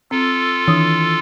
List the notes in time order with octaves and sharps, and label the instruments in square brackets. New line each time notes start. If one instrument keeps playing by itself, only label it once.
[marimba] C4 [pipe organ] F4 A4
[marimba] D#3 D4 D#6 [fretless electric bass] E3